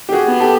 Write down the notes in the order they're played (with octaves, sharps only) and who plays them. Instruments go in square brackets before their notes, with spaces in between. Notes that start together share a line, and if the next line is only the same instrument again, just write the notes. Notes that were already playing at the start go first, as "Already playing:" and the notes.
[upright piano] G4
F#4 G#4
[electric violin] B3
[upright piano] G4 A4